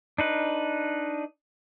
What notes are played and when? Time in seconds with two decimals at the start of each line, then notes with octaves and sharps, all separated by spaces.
0.18 D4 D#4 B4